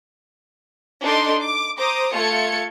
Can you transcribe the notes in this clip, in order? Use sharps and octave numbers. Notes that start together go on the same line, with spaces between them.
D4 D#4 A4 C6 D6
D6
C5 A#5 D6 D#6
A3 F4 A4 G#6 C#7